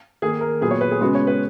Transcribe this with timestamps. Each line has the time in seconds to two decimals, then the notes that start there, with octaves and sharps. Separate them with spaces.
0.22 D#3 A#3 G#4
0.41 A#4
0.61 A#2 F#3 B3 G#4
0.71 C#5
0.81 B4
0.91 G#4
1.01 C#3 G#3 B3 F#4
1.15 C#5
1.27 B4